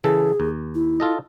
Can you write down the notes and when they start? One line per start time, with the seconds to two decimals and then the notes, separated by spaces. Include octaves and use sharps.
0.04 C#3 E3 G#4 A4
0.40 D#2
0.75 E4
1.00 F4 A4 D#5